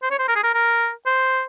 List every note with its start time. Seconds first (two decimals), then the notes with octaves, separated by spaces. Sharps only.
0.03 C5
0.11 C#5
0.19 C5
0.28 A#4
0.36 G#4
0.43 A#4
0.54 A#4
1.06 C5